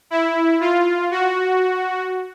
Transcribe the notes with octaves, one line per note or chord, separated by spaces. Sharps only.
E4
F4
F#4